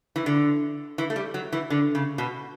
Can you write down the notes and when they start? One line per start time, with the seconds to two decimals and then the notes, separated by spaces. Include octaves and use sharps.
0.16 E3
0.26 D3
0.98 E3
1.10 A3
1.16 G3
1.34 F#3
1.52 E3
1.70 D3
1.95 C#3
2.18 B2